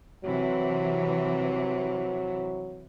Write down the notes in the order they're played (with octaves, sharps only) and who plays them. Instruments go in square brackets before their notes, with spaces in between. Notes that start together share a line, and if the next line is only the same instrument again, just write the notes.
[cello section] C3 E3 [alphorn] F#3